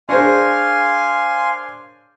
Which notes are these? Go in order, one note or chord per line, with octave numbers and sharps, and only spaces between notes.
D4 G#4 A#4 C5 C#5 F5 G#5 C6